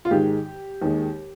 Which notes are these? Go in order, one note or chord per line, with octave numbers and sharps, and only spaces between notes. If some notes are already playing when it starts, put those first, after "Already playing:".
F4
G#2 D#3 G#3 G4
D#2 D#3 G#3